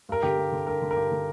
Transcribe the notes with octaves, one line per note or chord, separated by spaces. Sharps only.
G2 A#4
D3 G4
G2
D3
G2 A#4
D3
A#4
G2 G4
D3